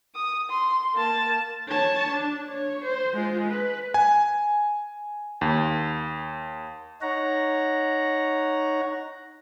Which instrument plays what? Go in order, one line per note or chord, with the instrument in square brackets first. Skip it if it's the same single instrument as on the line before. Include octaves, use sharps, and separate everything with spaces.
[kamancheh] D#6
C6
A#3 A5
[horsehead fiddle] C#5 A5
D4
C#5
C5
G#3 F4
B4
[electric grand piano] G#5
D#2
[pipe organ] D#4 C#5 F#5 A#5